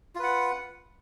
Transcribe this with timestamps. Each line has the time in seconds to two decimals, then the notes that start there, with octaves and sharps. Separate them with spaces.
0.15 F4
0.19 B4
0.23 F#5